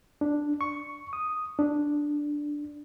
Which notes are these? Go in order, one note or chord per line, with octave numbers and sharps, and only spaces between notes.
D4
C#6
D#6
D4